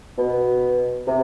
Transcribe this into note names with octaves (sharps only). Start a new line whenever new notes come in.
B2
C3